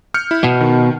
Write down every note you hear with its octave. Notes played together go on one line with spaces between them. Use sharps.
F6 G6 C#7
E4
B2 B3
D#3